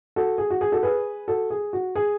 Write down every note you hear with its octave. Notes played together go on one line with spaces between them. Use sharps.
F#4 A4
G#4
F#4
G#4
F#4 A4
G#4 B4
F#4 A4
G#4
F#4
G#4